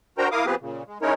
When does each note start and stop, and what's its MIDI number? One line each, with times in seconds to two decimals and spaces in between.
0.18 0.28 62
0.18 0.28 66
0.18 0.28 70
0.18 0.28 72
0.18 0.28 79
0.18 0.28 82
0.32 0.46 64
0.32 0.46 70
0.32 0.46 77
0.32 0.46 86
0.32 0.46 87
0.46 0.55 53
0.46 0.55 59
0.46 0.55 60
0.46 0.55 67
0.46 0.55 68
0.46 0.55 71
0.61 0.83 46
0.61 0.83 49
0.87 0.98 56
1.02 1.14 56
1.02 1.14 61
1.02 1.14 63
1.02 1.14 64
1.02 1.14 70
1.02 1.14 73